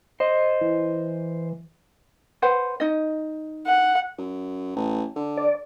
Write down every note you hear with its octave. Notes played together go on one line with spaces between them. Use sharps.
C5 D#5
E3
B4 C5 F#5
D#4 D#5
F#5
F#2
A1
D3
D5